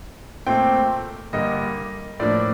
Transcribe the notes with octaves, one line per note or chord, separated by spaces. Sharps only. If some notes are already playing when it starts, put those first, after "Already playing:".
A#2 A3 C4 G5
G2 D3 G3 A#3 D#5
A2 F3 A#3 D4 D5